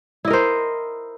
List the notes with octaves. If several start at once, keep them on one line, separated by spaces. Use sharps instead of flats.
E4 A#4 C5 D#5